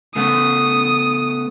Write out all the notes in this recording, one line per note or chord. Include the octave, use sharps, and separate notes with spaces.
C#3 A3 B3 D#6